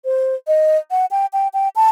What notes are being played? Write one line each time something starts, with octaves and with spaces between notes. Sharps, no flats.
C5
D#5
F#5
G5
G5
G5
A5